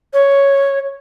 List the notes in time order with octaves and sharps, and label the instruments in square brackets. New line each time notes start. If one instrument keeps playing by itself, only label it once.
[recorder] C#5